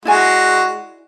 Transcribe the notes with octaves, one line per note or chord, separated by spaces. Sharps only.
G#3 E4 F#4 D5 G#5